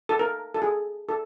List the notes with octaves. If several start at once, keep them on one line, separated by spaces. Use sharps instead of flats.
A4
A#4
A4
G#4
A4